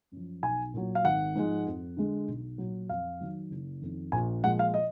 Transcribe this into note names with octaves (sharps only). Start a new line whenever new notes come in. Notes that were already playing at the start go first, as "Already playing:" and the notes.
F#2 F3
B1 G#5
A#2 F#3
F5
G#1 F#5
G#2 F3 G#3
F2
D3 G#3
B1
A#2 F#3
F2 F5
D#3 F#3
F#1
F2 D#3
A#1 G#5
A#2 F3 G#3 F#5
F5
D#5